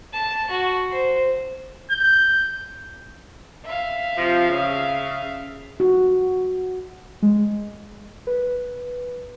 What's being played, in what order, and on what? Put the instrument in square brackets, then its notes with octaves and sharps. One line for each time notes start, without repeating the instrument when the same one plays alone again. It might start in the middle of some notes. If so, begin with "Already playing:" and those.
[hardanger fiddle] A5
F#4
C5
[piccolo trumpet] G6
[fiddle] E5 F5
[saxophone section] C3 F3
C#3
[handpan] F#4
[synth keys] G#3
B4